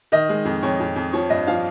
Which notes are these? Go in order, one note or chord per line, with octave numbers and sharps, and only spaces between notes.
D#3 D#5
G#3
F2
F2 C#5
F2
F2
F3 C#5
G2 D#5
F3 F5